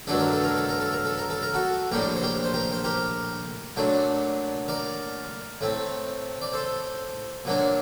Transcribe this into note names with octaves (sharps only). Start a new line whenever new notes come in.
G2 D#3 F#3 A3 D4 A4
A#4
A4
A#4
A4
A#4
A4
A#4
A4
A#4
A4
A#4
F#4 A4
A#1 A2 G3 D4 G4 A#4
C5
G4 A#4
C5
G4 A#4
C5
G4 A#4
A#2 F#3 A3 D4
A#4 D5
A2 A3 C4
D5
A4 C5
A#2 F#3 A#3 D4